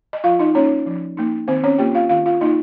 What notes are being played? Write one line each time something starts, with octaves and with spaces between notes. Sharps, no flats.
D#5
F3 F4 F5
D#4 D#5
A#3 C#4 D#4 C#5
F3
A#3 D#4
D#3 C4 C5
C#4 C#5
A#3 F4 G4 G5
F4 F5
D#3 F4 F5
F4 F5
A#3 D#4 F4 D#5